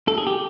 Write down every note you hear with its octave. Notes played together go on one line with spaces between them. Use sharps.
A4
G#4
G4